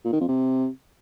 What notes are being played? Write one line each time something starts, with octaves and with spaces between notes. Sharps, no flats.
A#2
D#3
F2
C3